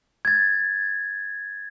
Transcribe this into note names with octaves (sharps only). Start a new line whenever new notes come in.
G#6 A6